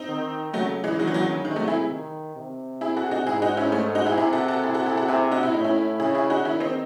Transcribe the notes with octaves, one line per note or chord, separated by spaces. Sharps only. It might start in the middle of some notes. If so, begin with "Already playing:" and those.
Already playing: C4 D#4
D#3
C#3 F#3 A3
E3 G#3
D#3 F#3
E3
D#3 F#3
D#3
C3 D#3
G#3
F#3 A3
E4 G#4
D#3
C3
E4 G#4
F#4 A4
G#4
D#4 F#4
G#2 E4 G#4
D#4 F#4
C#4 E4
A3 C#4
D#4 F#4
E4 G#4
C3 E4 G#4
F#4 A4
F#4 A4
E4 G#4
F#4 A4
E4 G#4
F#4 A4
C3 E4 G#4
D#4 F#4
E4
A2 D#4
C#4 E4
C#3 E4 G#4
E4 G#4
D#4 F#4
D#3 C#4 E4
C4 D#4